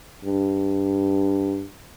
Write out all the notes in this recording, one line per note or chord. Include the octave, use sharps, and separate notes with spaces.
G2